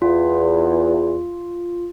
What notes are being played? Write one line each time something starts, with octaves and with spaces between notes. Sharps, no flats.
E2 F4